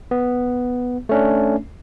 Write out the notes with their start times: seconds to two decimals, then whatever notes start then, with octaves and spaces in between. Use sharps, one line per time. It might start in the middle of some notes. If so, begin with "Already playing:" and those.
0.11 B3
1.09 A3 C#4 D4